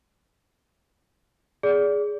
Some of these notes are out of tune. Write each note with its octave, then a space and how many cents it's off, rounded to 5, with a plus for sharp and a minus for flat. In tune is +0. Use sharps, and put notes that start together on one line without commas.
G#4 +0 D5 -25